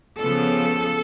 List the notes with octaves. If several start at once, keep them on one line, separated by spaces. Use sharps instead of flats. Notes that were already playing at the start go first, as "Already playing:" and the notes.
C#3 F3 B3 A4